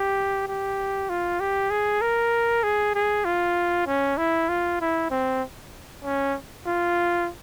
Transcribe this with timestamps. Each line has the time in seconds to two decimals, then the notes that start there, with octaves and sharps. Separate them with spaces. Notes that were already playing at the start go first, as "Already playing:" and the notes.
Already playing: G4
0.48 G4
1.09 F4
1.40 G4
1.70 G#4
2.01 A#4
2.63 G#4
2.95 G#4
3.25 F4
3.87 C#4
4.18 E4
4.49 F4
4.81 E4
5.10 C4
6.04 C#4
6.66 F4